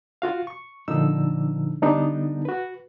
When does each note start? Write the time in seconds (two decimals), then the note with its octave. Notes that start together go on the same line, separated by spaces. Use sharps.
0.22 F4 F#4 F5
0.47 C#6
0.88 A#2 D3 F3 D4 D#4 E6
1.82 D3 G3 B3 D4 D#4
2.45 F#4 B4